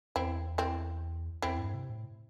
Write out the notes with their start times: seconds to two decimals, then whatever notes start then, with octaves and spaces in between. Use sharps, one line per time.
0.16 E2 C4 E4
0.58 C4 E4
1.42 E2 C4 E4
1.59 G2
1.74 C3
1.90 A2